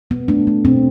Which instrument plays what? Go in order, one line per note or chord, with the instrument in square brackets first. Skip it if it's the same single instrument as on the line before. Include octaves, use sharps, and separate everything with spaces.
[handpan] B2 B3
A3 D4
A3
B2 C4